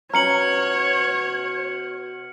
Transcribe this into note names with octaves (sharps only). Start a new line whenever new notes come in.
B2 C#4 C#5 A#5 F6 C#7 F#7